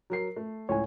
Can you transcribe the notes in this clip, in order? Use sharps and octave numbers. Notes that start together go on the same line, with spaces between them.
F#3 A#4 C7
A3
C#2 A2 C#5 G#5